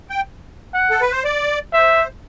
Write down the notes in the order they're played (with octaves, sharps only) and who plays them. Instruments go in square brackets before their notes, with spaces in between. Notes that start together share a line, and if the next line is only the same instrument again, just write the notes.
[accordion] G5
[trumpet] F#5
[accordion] A4
B4
C5
D5
[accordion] C5 [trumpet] E5